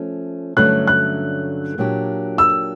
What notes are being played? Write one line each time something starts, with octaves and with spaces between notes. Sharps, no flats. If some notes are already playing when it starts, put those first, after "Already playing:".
Already playing: F3 A3 C#4
G2 D3 F#3 A3 C#4 F#6
F#6
A#2 F#3 A#3 D4 G4
E6